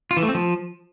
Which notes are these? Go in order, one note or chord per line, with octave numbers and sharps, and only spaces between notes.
F4
E3
A3
C4
F3